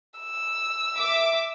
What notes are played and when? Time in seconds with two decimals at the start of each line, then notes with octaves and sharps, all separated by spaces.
0.20 E6
0.99 E5 D6